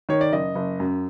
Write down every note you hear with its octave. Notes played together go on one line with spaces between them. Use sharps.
D#3 C#5
D5
F#1 D#5
F#1
F#2